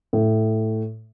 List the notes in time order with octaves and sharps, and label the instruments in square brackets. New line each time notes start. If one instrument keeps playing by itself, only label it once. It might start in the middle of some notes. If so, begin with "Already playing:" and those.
[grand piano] A2